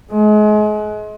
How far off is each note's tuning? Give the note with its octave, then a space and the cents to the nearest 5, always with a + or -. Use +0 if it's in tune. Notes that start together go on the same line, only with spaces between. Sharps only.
G#3 +35